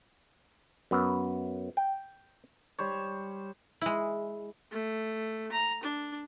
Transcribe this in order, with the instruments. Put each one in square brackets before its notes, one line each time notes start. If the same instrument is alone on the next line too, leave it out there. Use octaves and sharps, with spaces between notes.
[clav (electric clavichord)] F#2 B3
G5
[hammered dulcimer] G3 C5 C#5
[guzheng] G#3 E4
[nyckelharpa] A3
A#5
D4